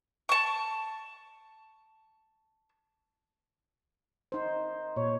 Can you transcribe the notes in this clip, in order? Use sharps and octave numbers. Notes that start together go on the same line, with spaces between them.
A5 C#6
D#4 C5
A#2 C#5